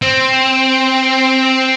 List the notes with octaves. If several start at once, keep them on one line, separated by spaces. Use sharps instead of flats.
C4